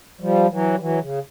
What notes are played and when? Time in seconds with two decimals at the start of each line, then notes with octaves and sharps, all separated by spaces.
0.20 F3 G3
0.50 E3 F#3
0.74 G3
0.79 E3 F#3
1.01 C#3